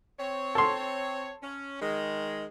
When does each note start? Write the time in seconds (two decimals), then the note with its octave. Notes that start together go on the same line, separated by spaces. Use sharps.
0.19 C4 C#5
0.55 A4 C6
1.42 C#4
1.81 D#3 G#3